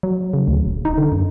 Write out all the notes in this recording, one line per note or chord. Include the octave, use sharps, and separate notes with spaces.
F#3
C#3
D2
D#1
D#4
D3
F#2